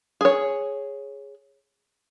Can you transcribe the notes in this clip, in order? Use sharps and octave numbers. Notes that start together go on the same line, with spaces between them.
G#4 C#5